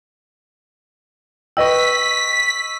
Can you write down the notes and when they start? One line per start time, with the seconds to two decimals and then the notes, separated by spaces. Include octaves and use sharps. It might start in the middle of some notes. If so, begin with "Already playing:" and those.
1.57 B4 D#5 G5 C#6 E6 B6